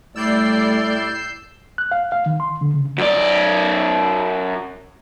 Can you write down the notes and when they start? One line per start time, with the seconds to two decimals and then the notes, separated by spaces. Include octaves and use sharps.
0.16 A2 G3 A3 D5 E6 G6 C7
1.78 F#6
1.92 F5
2.12 F5
2.26 D#3
2.40 C6
2.61 D3
2.74 C#3
2.98 F#2 D5